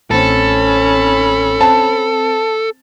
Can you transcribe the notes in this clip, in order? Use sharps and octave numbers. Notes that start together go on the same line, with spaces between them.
A1 A2 C4 C#4 A4 B5
C4 A5